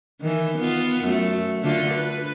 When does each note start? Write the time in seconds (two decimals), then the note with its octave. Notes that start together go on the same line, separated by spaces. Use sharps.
0.21 D#3 E3
0.58 B3 F4
1.05 F#2 A3
1.63 D3 A3 F4
1.93 B4